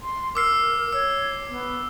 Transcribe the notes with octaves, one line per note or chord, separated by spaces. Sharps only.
C6
A#4 D6 E6 C7
C#5 E6
B3